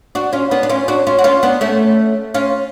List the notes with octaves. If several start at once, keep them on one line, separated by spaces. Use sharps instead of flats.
D4 F#4
C#4 F4
B3 D4
D4
C#4 F4
D4 F#4
C#4 F4
F#4
C#4 F4
B3 D4
A3 C#4
C#4 F4